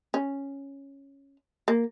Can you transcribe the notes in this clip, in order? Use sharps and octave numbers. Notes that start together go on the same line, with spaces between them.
C#4
A#3